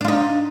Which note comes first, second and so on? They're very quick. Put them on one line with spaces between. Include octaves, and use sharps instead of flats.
D4 F4 D#4